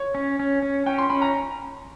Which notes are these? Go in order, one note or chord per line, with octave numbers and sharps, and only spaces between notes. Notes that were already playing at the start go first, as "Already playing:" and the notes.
Already playing: C#5
C#4
C#4
C#4
C#4 G5
C6
C#4 B5
A#5